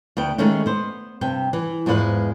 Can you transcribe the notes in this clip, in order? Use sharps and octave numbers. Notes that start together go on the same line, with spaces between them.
D2 B3 G5
D#3 G#3 A3 C#4 D#4
B3 C5
G2 C3 G5
E3
E2 G#2 F3 G#3 B4